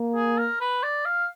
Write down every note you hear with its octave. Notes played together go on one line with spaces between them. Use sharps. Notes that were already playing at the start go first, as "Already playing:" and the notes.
Already playing: A#3
G#4
A#4
B4
D5
F5